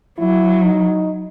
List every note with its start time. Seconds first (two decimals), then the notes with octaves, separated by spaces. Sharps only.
0.18 F#3 E4
0.63 D#4